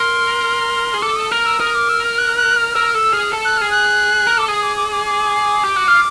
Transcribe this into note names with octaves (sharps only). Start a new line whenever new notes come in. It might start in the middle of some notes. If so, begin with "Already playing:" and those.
Already playing: A#4 C6
G#4
A4 D6
D#6
A#4 F6
E6
A#4 D#6
D6
E6
F6
F#6
F#6
F6
A#4 E6
A4 E6
G#4 F6
A4
F#6
G#4 F6
F#6
A#4
A4 D6
G#4 D#6
D6
D6
D6
D6
G4
F#4
F4